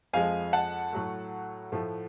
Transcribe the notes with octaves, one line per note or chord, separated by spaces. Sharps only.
F2 F3 G#3 F5 G#5
F#5 A5
A2 F#3 A3
A2 F3 A3